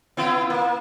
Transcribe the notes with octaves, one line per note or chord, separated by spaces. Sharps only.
B3 E4 F4
A#3